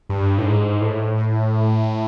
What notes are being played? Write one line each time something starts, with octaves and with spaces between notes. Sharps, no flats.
G2
A2
G#2
A2